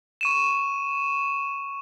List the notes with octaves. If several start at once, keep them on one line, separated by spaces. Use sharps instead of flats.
C#6 D#7 E7